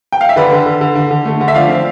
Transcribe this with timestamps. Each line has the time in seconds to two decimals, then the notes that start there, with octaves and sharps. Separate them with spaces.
0.12 G5
0.21 F5
0.29 E5
0.36 D3 B4 D5
0.52 D3
0.66 D3
0.81 D3
0.96 D3
1.11 D3
1.25 A3
1.41 D3
1.48 E5
1.55 F3 D5 F5
1.69 C4